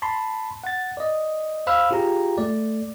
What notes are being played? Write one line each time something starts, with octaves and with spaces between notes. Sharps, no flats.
A5 B5 C6
F#5 A6
D5 D#5
C5 F5 B5 E6 F6
F4 G4 G#4 G5 A#5
A3 D5